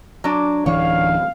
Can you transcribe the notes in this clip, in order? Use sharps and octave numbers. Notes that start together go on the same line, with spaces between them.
F#3 D4
D1 E3 D4 C#5 F5